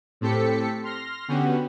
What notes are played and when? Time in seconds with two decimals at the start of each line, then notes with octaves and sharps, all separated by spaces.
0.21 A2 C4 G4 A4 B6 C#7
0.83 C6 F6 A#6
1.28 D3 B3 C#4 F#4 G4